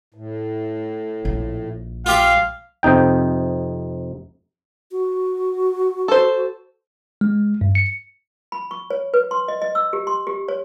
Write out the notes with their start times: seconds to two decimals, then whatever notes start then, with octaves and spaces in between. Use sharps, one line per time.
0.14 A2
1.25 A#1
2.06 F4 G4 E5 F5
2.83 F2 C3 D#4 G5
4.92 F#4
6.08 A4 C5
7.21 G#3
7.61 G2
7.75 C#7
8.52 B5
8.71 C#6
8.90 C#5
9.14 B4
9.31 C6
9.48 D#5
9.62 D#5
9.75 E6
9.93 G4
10.07 C6
10.27 G4
10.48 C#5